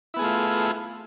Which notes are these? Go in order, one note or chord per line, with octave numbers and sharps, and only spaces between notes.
A3 B3 E4 F4 G#4